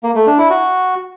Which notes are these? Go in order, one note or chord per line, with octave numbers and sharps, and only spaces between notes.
A#3
A3
D4
E4
F#4